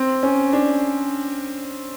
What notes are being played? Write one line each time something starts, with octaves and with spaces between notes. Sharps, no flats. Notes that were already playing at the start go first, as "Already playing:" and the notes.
Already playing: C4
C#4
D4